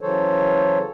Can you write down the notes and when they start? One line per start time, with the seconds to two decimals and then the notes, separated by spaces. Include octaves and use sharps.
0.01 C#3 E3 F#3 A4 C5 C#5